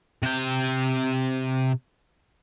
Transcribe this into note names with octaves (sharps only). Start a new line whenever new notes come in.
C3 G5